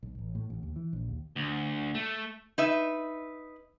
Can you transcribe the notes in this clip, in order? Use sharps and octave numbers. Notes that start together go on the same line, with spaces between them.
B1
A1
A2
A1
D#2
E3
A#1
D#2
D2
A3
D#4 B4 E5